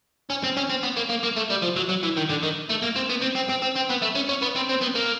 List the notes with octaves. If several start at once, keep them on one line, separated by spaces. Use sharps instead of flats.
C#4
C4
C#4
C4
B3
A#3
A#3
A#3
A3
G3
F3
F#3
F#3
E3
D#3
D3
D#3
A3
A#3
C4
B3
C4
C4
C4
C4
C4
B3
A3
C#4
C#4
B3
C4
C4
B3
A#3